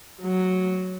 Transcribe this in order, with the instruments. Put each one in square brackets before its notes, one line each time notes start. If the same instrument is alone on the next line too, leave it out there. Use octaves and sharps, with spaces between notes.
[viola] F#3